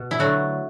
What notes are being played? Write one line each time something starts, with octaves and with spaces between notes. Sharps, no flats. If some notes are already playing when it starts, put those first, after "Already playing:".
Already playing: B2
E4
D3 F#3 A3 F#4